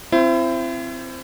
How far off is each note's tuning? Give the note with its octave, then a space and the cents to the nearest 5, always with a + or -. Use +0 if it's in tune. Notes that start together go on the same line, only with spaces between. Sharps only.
C4 +0 E4 +35 C5 +0